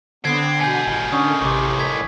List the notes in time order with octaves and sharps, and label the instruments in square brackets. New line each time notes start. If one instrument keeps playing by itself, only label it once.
[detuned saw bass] D3 [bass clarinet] B3 [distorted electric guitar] C4 [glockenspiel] G#6 C7
[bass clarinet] B2 [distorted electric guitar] B3 G#4 [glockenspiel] G#5 G6
[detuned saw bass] G1 [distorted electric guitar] A2 D#3
[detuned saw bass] D3 [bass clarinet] C#4 [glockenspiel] D#6
[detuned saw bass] A1 [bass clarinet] C3 [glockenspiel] C#6 D6
[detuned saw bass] G1 [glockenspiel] A5 G#6 B6